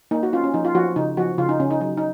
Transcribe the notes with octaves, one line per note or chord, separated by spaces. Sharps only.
A#3 D#4
F#4
C#4 F4
C#4
F3 D#4
F4
F3 F#4
C#3 D#4
F3 F#4
C#3 F4
D#4
C#3 C#4
D#4
F#3 D#4
D#4